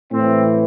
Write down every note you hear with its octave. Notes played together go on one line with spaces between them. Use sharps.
A2 E3 C4